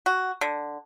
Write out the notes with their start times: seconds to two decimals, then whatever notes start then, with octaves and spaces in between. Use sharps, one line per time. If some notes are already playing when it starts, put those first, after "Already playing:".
0.06 F#4
0.41 D3